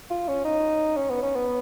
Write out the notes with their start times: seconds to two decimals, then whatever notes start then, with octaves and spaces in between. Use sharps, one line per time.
0.10 F4
0.28 C#4
0.45 D#4
0.96 C#4
1.10 B3
1.23 C#4
1.35 B3